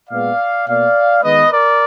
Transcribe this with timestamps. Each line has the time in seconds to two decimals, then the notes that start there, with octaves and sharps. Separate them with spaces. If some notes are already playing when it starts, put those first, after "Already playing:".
0.10 A#2 G#3 B3 D5 F5
0.66 B2 A#3 D5 F5
1.22 D#3 G#3 B3 B4 D#5
1.51 A#4 D5